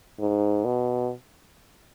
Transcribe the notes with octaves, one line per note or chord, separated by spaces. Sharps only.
G#2
B2